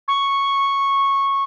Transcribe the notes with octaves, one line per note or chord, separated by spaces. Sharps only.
C#6